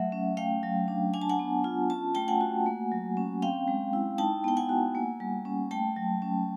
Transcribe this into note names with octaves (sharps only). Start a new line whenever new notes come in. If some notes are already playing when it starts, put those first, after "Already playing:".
Already playing: F#3 A3 E5 F#5
C#4
A3 F5 G5
F#3
D4
D4 G#5
A5
F#5 G#5
B3
F4
C#4 A5
A3 G5 A5
F#5 G#5
F#4
A#3
F#3
C#4
C4 F5 G5
G#3
E4
D#4 G5 A5
B3 G5
F#5 G#5
F#4
A#3
G3
C#4
A3 G5 A5
F#3
C#4